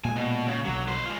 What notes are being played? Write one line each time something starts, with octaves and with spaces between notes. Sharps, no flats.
A#2 G#3 G#5
B2
C#3
B1 D3 F#3
B4 C5
G#3 F4